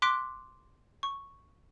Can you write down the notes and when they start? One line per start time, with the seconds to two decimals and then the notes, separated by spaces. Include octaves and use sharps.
0.02 C6 D6 F#6 B6 D7
1.03 C#6